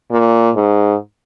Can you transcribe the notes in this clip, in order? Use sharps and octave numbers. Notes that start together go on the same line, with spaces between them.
A#2
G#2